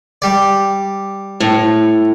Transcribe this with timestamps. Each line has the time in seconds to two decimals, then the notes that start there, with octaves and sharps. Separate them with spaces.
0.22 G3 D5
1.40 A2